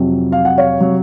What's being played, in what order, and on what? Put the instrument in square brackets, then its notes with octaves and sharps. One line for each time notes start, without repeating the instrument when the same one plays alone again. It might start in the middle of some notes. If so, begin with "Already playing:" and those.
Already playing: [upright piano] F2 C3 F#3
F5
F#5
C#5 F5
C3 F#3